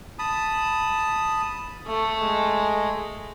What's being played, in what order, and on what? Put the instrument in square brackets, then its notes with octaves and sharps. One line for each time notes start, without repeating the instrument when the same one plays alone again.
[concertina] A5 B5 D#6
[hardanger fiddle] A3
[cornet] G#3